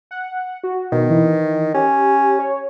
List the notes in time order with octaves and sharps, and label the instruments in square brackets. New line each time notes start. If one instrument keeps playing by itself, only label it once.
[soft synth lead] F#5
F#4
[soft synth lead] B2 [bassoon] D#3
[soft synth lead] E3
[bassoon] C#4 [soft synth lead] G4
[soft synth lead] C#5